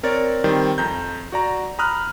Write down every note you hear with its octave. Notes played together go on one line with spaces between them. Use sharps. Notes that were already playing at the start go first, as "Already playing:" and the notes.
C4 A#4 C#5 D5 A6
D#3 G3 C4
F2 A#5 G6
F#4 D5 A#5
A#5 B5 D#6 F6 F#6